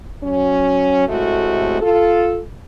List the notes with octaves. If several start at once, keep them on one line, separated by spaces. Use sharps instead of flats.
F#3 C#4
A2 C3 G#3 A3 F#4
F4 A4